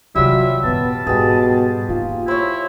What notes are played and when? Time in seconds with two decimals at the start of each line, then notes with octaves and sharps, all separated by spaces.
0.16 C3 D#3 F#3 G3 F4 E5
0.64 F#2 A#2 B3 A5
1.07 G#2 B2 G3 G4 G#4
1.89 A#3 D#4 F4
2.28 E4 C5 C#5